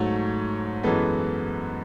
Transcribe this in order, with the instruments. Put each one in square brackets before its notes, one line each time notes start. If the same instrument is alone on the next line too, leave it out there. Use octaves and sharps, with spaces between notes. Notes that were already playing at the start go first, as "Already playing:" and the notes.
Already playing: [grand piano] G#2 F#3 A3 C#5
F#2 E3 G#3 B3 A4